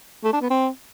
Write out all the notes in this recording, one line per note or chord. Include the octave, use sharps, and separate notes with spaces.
A3
D4
B3
C4